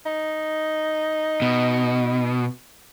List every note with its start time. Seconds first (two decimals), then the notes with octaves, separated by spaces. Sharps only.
0.06 D#4
1.42 B2